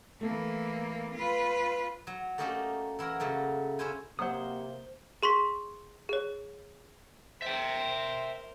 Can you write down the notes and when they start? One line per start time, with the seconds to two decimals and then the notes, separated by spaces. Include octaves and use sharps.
0.21 E3 A3 A#3 A4
1.14 F4 B4
2.07 F#3
2.38 A3 A#3 C#4 D#4 F#4 G4
2.99 E3 E4 F#4 A#4
3.20 C#3 F#3 A3 A#3
3.79 C#4 E4 C5 G#5
4.19 C3 F#3 A#3 C5 F#5 D#6
5.23 G#4 C6 C#6 B6
6.09 G#4 C#5
7.42 A#4 C5 E5 G5